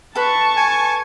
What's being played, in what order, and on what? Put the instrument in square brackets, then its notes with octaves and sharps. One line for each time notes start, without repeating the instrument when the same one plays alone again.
[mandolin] A4 B4 [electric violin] A5 C#6
[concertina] G#5